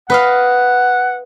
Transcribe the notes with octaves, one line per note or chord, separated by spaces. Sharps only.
B4 D#5 F5 F#5